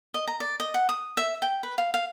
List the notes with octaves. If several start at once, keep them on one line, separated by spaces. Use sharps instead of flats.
D#5
A#5
D5
D#5
F#5
D#6
E5
G5
B4
F5
F5